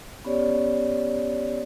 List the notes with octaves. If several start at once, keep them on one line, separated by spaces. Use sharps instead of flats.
B3 C#4 G4 C#5 D5